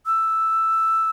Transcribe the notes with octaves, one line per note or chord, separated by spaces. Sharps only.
E6